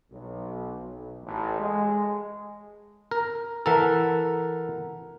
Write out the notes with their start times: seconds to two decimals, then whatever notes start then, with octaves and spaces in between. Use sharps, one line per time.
0.11 B1
0.79 B1
1.23 A1
1.60 G#3
3.11 A#4
3.66 E3 A4 A#4 F#5 A#5